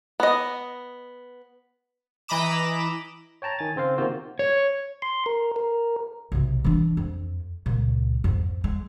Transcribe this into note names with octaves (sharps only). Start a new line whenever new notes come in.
B3 D#5
E3 D#5 A#5 B5 D6 E7
C#5 G5 A5 A#5
D#3 G#5 A6
C#3 C4 C5 F5
C3 D#3 A#3 F4 F#4 C5
C#5
C6
A#4
A#4
B1 C3
E3 D4
F2
C#2 A#2
F2 G#2
G#3